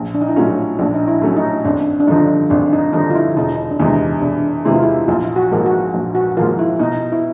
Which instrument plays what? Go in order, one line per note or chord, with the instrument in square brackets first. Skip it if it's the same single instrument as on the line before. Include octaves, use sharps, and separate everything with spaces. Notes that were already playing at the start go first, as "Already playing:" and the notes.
Already playing: [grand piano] A#1
[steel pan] D4
D#4
E4
[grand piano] A2 F#3 A3 C#4 [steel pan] F4
[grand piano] A#1 [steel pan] D4
[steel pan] D#4
E4
[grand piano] A2 F#3 A3 C#4
[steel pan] D#4
[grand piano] G#1 [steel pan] D4
[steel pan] D4
[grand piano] G2 D3 F3 [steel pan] D#4
[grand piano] G#1 [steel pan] D4
[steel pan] D#4
[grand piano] G2 D3 F3 [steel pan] D#4
[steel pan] F4
E4
[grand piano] E1 [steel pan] D#4
[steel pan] D4
[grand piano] E2 C3 E3 G#3 [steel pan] D#4
[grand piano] E1 [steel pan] D4
[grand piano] E2 C3 E3 G#3 [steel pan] E4
[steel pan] F4
E4
[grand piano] A#1 [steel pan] F4
[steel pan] F#4
[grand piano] G#2 F3 A#3
[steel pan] F#4
[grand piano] A#1
[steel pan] F#4
[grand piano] G#2 F3 A#3 [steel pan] F4
[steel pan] E4
[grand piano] B2 [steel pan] D#4
[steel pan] E4